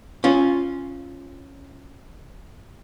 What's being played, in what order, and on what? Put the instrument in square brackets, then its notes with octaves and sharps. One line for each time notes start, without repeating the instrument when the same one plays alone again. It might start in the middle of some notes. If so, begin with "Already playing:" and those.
[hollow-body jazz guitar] C#4 F4